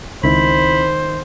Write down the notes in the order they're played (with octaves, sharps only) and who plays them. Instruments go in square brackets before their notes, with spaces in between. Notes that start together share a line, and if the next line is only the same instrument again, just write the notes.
[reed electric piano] C#2 C4 E4 [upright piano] D#3 [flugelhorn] C5 [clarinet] B5